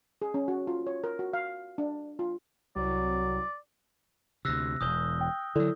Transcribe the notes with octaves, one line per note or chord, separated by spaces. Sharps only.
G#4
C#4
F#4
F4
C#5
A#4
F#4
F5
D4
F4
C2 F#3 D5
D2 C3 E6 F#6 A#6
E1 E2 D#6 G6 G7
G5
D3 F#3 E4 A4 D5